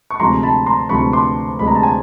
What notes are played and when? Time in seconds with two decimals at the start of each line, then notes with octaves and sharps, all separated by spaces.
0.11 C#6
0.20 D2 C3 F3 G#3 A#5 C6
0.43 A5 B5
0.66 A#5 C6
0.89 D2 C3 F3 G#3 B5 C#6
1.13 C6 D6
1.59 D2 C3 F3 G#3 B5
1.67 A#5
1.75 A5
1.83 G#5 A#5